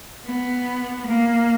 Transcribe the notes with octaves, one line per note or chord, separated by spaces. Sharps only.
B3
A#3